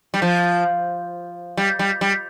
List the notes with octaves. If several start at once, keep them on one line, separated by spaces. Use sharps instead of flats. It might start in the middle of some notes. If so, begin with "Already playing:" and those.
G3
F3
G3
G3
G3